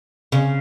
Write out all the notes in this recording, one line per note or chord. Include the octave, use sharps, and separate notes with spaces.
C#3